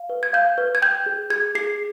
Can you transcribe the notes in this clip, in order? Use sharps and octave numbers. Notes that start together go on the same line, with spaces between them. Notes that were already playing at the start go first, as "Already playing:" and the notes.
Already playing: F5
B4
G#6
F5 G6
B4
G#6
G5 G6
G#4
G#4 G#6
G#4 C7